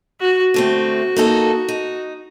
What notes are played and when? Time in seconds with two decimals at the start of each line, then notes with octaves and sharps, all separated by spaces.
0.20 F#4
0.54 D3 A3 C4 F#4
1.16 A#3 D#4 A4
1.68 D#4